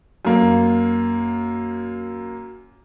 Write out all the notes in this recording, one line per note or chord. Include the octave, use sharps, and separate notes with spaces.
F#2 A#3